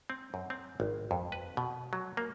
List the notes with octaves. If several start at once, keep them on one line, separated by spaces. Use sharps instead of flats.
C4
F#2
C4
G#1
F2
B4
B2
F#3
A#3